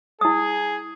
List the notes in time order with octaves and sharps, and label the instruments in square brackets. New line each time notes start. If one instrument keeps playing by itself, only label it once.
[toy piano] E4 D#6 [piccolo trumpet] G#4